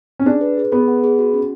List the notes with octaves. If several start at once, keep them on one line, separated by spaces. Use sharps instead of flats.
C#4
D4 G#4
B4
G#4
B3 G#4
F#5
G#4
F#4
C#4